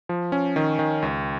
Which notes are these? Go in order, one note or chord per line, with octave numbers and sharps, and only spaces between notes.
F3
C#4
D#3
D#3
C#2